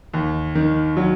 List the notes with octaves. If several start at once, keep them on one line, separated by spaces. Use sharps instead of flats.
D#2
D#3
F#3